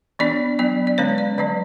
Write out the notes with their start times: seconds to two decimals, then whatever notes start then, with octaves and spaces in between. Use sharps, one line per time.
0.19 E3 B3 D4 D5
0.59 F#3 B3 D4 D5
0.87 D5
0.98 D3 G#3 C#4 C#5
1.18 D5
1.38 D3 F#3 C#4 D5